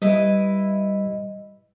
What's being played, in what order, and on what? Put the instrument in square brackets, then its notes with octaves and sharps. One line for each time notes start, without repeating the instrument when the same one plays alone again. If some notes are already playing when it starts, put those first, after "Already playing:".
[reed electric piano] G3 [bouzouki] E4 B4 D#5